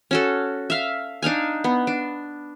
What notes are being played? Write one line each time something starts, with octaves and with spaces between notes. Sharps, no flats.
C#4 F#4 A4
E5 F5
D4 D#4 F5 G#5
B3
D4